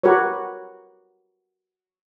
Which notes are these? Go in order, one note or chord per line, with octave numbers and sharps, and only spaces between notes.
F#4 G4 A#4 B4 C#5